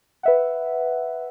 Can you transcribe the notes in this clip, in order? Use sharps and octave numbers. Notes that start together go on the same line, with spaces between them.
B4 E5 F#5